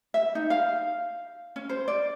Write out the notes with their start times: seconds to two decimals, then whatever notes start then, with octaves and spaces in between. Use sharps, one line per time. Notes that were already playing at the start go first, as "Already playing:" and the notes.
0.14 E5
0.35 D#4
0.50 F5
1.56 C#4
1.69 C5
1.88 D5